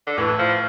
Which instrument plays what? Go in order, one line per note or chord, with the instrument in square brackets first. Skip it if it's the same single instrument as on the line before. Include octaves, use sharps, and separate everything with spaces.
[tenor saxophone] D3
[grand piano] A2 [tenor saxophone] E3
[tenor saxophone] F3